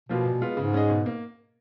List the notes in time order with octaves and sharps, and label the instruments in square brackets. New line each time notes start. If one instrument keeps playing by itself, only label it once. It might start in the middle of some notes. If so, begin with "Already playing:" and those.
[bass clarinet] B2 [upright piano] F3 A#3 F4 B4
[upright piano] A#2
G#3 B3 F4
[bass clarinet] G#2 [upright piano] C#3
[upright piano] G#3 C#4 G#4 D#5
B2
A#3